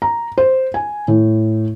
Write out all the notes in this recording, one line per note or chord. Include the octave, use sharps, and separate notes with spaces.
A#5
C5
G#5
A2